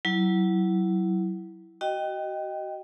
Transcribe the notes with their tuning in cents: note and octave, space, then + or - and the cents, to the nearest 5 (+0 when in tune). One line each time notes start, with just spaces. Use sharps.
F#3 +20 E4 +0
F#4 +30 D#5 +0 G5 +0